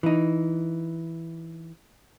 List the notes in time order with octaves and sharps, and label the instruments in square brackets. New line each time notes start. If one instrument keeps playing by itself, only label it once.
[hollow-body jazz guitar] E3 D#4